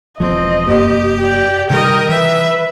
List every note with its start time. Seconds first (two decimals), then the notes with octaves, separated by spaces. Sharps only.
0.20 E1 E2 F3 C4 D#5
0.67 F1 F#2 A#3 G4
1.21 D5 G5
1.70 C3 D#3 G3 A#4 D#5 G5
2.09 E3 B4 E5